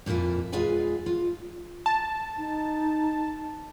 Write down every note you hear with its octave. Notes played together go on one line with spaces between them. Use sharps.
F2 A#2 A#3 E4 F4
E2 G#3 F4 G#4 B4 G#5
F4
A5
D#4